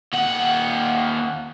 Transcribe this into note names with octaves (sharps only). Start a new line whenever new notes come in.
D#2 F#5